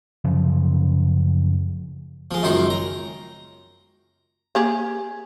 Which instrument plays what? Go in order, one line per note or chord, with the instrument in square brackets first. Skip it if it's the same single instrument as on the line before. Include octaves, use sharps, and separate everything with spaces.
[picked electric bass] F#2 C#3 F3
[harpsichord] F3 G#3
C#2 F#2 D#3 D#4 C6
A#5
[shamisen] A#3 G4 G#4